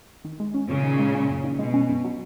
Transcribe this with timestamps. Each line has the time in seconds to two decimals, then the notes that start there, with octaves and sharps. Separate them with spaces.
0.25 D#3
0.40 G#3
0.54 C#4
0.69 F#2 A#2 C#3
0.83 D#3
0.99 G#3
1.15 C#4
1.29 F#2
1.44 D#3
1.59 B2 G#3
1.74 C#4
1.89 F#2
2.04 F#3